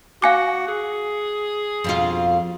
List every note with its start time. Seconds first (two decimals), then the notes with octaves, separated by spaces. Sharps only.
0.22 F#4 F5 G#5 D6
0.68 G#4
1.84 F2 B2 F4